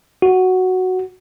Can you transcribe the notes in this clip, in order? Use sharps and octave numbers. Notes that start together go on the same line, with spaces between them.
F#4